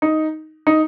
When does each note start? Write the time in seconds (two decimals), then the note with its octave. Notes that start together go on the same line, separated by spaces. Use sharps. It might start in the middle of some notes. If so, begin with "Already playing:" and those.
0.02 D#4
0.67 D#4